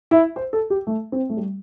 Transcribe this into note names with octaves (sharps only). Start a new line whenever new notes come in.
E4
C5
A4
G4
A3
C4
A3
G3